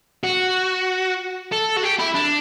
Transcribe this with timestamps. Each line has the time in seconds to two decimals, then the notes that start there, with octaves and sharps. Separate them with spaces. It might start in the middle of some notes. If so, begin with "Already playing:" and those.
0.24 F#4
1.52 A4
1.76 F#4
1.83 G4
1.99 E4
2.14 D4